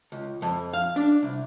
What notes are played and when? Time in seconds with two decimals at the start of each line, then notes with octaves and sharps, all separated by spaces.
0.12 C#2
0.42 F2
0.73 F5
0.96 D4
1.23 C2